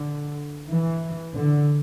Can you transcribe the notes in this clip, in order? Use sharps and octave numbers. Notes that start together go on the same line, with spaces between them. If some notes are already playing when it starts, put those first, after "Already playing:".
Already playing: D3
E3
D3